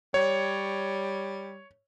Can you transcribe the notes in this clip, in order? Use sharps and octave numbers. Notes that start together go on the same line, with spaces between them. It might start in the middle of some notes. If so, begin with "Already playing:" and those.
G3 C#5